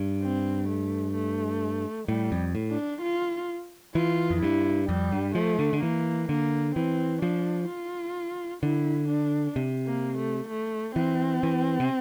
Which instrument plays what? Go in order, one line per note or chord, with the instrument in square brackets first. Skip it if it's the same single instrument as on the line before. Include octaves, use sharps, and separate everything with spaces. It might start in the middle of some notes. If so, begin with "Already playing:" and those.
Already playing: [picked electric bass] G2
[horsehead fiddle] C4
A3
A3
[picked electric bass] A2 [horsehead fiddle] G3
[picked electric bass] F2
A2
[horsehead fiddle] D4
F4
[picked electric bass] E3 [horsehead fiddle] F4
[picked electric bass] F2
[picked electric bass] G2 [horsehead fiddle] E4
[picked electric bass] F2 [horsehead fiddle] G3
[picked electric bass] G2
[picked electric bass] F3 [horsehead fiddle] A3
[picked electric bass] D3
D3
[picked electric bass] E3 [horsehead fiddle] A#3
[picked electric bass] D3 [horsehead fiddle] A#3
[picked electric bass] E3 [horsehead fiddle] C4
[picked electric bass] F3 [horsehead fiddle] D4
[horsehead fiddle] F4
[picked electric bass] D3 [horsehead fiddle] E4
[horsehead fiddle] D4
[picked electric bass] C3
[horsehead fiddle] A#3
A3
A3
[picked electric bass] E3 [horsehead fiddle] C4
[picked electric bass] E3
C3